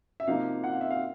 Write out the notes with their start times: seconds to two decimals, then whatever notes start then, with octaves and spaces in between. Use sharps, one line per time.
0.20 E5
0.27 C3 F3 A#3 D#4 F5
0.64 F#5
0.73 F5
0.81 E5
0.91 F5